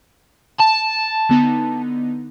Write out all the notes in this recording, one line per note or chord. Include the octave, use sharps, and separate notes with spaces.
A5
D3 B3 D#4